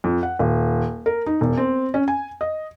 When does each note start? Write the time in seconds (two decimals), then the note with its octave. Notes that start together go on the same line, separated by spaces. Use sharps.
0.04 F2
0.23 F#5
0.39 D#1
1.06 A#4
1.26 D#4
1.41 E1
1.57 C4
1.94 C#4
2.08 G#5
2.41 D#5